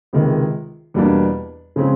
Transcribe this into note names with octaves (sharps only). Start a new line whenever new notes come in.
C#2 C3 D#3 G#3
E2 B2 G3 A#3 D4
C#3 F3 G#3 C4